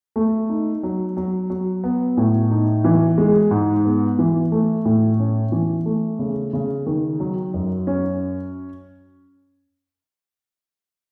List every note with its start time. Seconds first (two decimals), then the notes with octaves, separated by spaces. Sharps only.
0.16 A3
0.50 D#4
0.83 F#3
1.17 F#3
1.50 F#3
1.84 B3
2.17 A2
2.51 D#4
2.84 E3
3.18 G#3
3.51 G#2
3.85 B3
4.19 E3
4.52 A3
4.85 A2
5.20 C#4
5.52 E3
5.86 A3
6.19 C#3
6.53 C#3
6.86 D#3
7.20 F#3
7.54 F#2
7.87 C#4